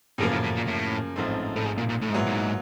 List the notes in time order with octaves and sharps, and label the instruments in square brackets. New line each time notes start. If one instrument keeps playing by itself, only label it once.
[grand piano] F#2 C#3 F3 A#3 [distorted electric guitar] A2
[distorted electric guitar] A2
A2
A#2
A2
[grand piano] A1 G#2 F3 A3 C4
[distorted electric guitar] A2
G#2
A#2
A#2
A2
G#2
[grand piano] A#2 F#3 B3 E4
[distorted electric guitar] G#2